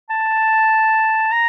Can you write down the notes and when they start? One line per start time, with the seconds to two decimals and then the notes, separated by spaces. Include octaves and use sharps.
0.10 A5
1.32 A#5